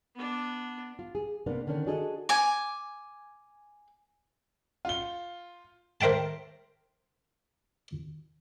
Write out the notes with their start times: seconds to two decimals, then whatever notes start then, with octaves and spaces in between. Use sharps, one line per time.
0.15 B3 D4
0.99 F4
1.15 G#4
1.46 C3 A#3 B3 D4
1.67 D3 D#3 C#4 D4
1.86 D4 F#4 G#4 A4 B4 D#5
2.29 G#5 D6
4.85 F4 G7
6.01 A#4 C5 E5 G5 A5